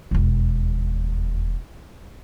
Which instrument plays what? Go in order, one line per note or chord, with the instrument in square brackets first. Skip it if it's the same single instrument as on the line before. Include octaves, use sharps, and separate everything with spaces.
[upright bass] E1 D#2